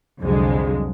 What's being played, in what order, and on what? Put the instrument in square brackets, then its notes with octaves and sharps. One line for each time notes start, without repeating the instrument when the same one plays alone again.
[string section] C2 F2 D3 F#3 G#3